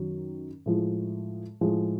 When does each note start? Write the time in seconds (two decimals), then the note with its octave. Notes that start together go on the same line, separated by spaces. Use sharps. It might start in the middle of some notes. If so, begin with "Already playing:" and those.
Already playing: F#2 D#3 F#3
0.66 A2 F3 G#3
1.61 A2 F3 G#3